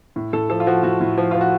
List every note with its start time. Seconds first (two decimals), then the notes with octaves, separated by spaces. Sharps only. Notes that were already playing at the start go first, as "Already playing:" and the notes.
0.16 A2
0.33 A2 A4
0.50 F3 A4
0.60 F4
0.66 F3 F#4
0.83 A2 F#4
1.01 A2
1.18 F3
1.31 F3 F4
1.41 F#4